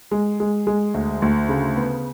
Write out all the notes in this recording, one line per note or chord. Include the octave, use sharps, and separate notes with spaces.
G#3
G#3
G#3
D2
D2
C#3
B3